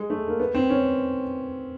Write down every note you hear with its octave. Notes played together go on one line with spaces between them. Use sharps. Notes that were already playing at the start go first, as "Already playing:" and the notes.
Already playing: G#3
A3
A#3
B3
C4
C#4